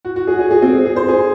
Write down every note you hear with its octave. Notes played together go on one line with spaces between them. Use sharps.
F#4
F#4
G#4
G#4
G#4
C4
G#4
C5
G#4